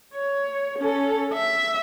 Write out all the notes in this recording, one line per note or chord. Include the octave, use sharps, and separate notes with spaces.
C#5
C#4 A4
E5